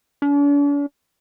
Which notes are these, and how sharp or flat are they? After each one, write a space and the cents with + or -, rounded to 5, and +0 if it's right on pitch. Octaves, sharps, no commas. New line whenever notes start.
D4 -45